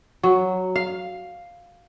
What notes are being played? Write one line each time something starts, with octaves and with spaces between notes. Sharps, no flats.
F#3
F5